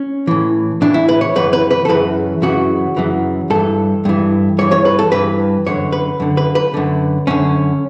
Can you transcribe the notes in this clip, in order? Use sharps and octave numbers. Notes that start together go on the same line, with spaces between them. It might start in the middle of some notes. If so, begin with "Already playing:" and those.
Already playing: C#4
A2 E3
A2 E3 D4
E4
B4
C#5
F#2 C#3 E3 B4
B4
B4
A4
F#2 C#3 E3 B4
F#2 C#3 E3 F#4
F#2 C#3 E3
G2 A4
E3
G2 E3
G2 E3 C#5
C#5
B4
A4
G2 E3 B4
F#2 D3 C#5
B4
F#2 D3
B4
B4
F#2 D3
F#2 D3 C#4